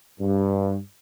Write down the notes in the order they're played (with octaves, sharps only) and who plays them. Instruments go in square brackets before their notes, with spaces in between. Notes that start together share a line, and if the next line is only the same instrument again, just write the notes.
[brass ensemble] G2